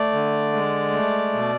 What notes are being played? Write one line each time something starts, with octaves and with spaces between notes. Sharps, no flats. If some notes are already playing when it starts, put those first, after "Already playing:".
Already playing: A3 D5
D3
G#3
A3
B2